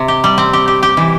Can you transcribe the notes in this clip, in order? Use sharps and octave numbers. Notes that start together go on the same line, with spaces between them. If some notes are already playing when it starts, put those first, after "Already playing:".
Already playing: C3
G4
G3
C4
G4
G4
G4
E3